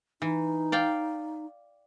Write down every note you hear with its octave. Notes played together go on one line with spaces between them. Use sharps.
E3 D#4
D5 F5 G5